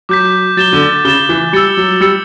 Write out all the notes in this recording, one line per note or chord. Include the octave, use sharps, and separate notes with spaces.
F#3 D6 G6 B6
F#3 A6 E7 G7
D3
C#3 A6 E7 G7
E3
G3 E6 A6 C#7
F#3
G3 E6 A6 C#7